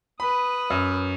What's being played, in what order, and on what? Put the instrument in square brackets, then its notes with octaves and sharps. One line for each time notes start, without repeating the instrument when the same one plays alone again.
[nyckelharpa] B4 D#6 [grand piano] B5
[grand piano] F#2